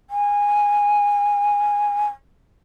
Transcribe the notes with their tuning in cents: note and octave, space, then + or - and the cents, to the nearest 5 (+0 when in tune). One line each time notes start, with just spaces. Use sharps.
G#5 -10